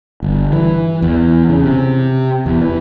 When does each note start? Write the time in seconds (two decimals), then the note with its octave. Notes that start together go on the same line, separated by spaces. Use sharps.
0.22 G1
0.53 E3
1.02 E2
1.49 C#3
1.64 C3
2.46 E2
2.61 E3